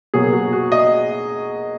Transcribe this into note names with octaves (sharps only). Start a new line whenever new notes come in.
B2 F#3 A#3 G#4
F#4
F#4
D#5